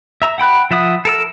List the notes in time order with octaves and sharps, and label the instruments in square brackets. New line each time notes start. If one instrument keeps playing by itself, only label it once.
[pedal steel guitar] E5 A#5 E6
F#5 G5 B5 F#6
F3 E5 F#5 D#6
A4 A#4 E6